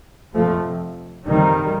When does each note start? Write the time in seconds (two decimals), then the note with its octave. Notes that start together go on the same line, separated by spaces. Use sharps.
0.35 F2 C3 F3 A3
1.25 F2 C3 D#3 G3